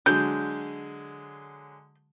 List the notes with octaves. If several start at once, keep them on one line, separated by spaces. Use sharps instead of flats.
D3 F#3 G#3 G6